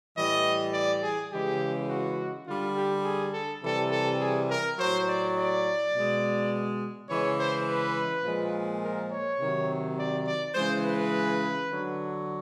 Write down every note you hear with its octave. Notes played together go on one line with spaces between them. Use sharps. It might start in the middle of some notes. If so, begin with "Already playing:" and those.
A2 E3 G3 D#5
D5
G#4
C#3 E3 G#3 G4
F#4
D3 G3 F4
G4
G#4
A4
C3 E3 G3 A4
A4
G#4
A#4
A2 F#3 C5
D5
D5
B2 G#3
C#3 E3 G#3 C#5
C5
B4
A#2 F3 G#3
A#4
C#5
C3 D#3 F#3
D5
D5
C#3 E3 G#3 C5
B4
D3 F#3